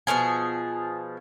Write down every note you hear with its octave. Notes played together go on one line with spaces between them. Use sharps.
B2 D3 F3 G#4